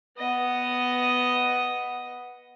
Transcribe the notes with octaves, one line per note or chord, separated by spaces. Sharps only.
B3 D#5